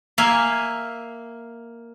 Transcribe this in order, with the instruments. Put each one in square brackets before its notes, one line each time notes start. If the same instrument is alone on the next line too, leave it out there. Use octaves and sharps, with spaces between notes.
[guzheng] A#3 E5 F5 G#5